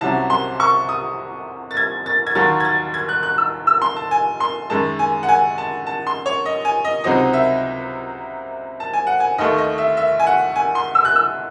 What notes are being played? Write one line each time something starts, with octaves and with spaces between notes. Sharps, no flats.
C2 C3 F#3 C#4 A5
C6
C#6
D#6
A6
G#6
A6
G#6
D#2 D#3 F#3 A6
G#6
A6
G#6
F#6
F#6
E6
E6
C6
A5
G#5
C6
F#2 D#3 G#3 A5
G#5
F#5
G#5
A5
A5
C6
C#5
D#5
G#5
D#5
C#2 C3 F#3 C4 D#4 D#5
E5
A5
G#5
F#5
G#5
D#2 D#3 A3 D#5
D#5
E5
E5
G#5
F#5
G#5
C6
E6
F#6
E6